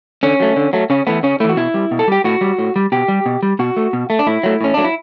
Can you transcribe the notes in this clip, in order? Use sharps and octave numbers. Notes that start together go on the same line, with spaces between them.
D3 C#4
F#3 A3
D3
F#3 A3
C#3 C#4
E3 A3 B3
C#3 C#4
E3 A3 E4
F#4
B2 E4
G3
B2
A4
G3 G4
A2 F#4
G3
A2
G3
B2 G4
G3
B2
G3
B2 F#4
A3
B2
A3
D4
A2 E4
F#3 A3
A2 C#4
F#3 A3 D4
E4